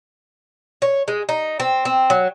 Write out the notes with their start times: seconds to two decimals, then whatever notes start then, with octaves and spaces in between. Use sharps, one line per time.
0.82 C#5
1.08 G#3
1.29 D#4
1.60 C4
1.85 C4
2.10 F#3